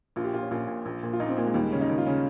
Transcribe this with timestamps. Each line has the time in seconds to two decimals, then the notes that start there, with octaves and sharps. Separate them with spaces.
0.16 A#1 F4
0.24 G4
0.33 A#2 F4
0.42 C#4
0.51 A#1 F4
0.67 A#2
0.85 A#1
1.03 A#2
1.13 F4
1.19 A#1 D#4
1.28 C4
1.37 A#2 A#3
1.46 G#3
1.54 D#2 G3
1.63 G#3
1.72 C#3 C#4
1.81 D#4
1.89 D#2
1.98 F4
2.06 C#3 C#4